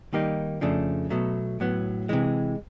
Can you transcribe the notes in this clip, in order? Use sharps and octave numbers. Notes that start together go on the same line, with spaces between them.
D#3 G3 A#3 D#4 G4
F2 C#3 F3 A3 D4
B2 F#3 A3
A2 F#3 B3
C3 E3 G#3